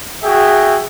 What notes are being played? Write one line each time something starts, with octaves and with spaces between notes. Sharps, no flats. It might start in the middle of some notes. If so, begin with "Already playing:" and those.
F#4 G#4 E5 G5